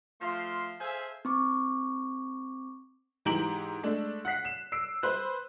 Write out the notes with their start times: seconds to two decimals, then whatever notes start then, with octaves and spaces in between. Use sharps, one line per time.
0.22 F3 A3 F5 C6
0.81 G#4 A4 C5 E5 F5 G#5
1.25 C4 C#6 D6
3.25 G#2 E3 G4 A#5 D7 F#7
3.83 G#3 A3 D4
4.25 F#5 F#6 B6 C7
4.45 E7
4.72 E6 C7 D7
5.03 B4 C5 F#6